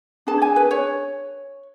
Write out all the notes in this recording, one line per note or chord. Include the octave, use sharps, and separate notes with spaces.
D4 G#4 B4 A5
G#5
B4
C#5